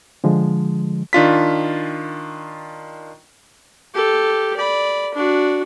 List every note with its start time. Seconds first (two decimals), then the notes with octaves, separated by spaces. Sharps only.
0.24 D3 F3 G#3
1.13 D#3 D4 F4 B6
3.95 G4 A4
4.57 D5 B5
5.15 D4 F#4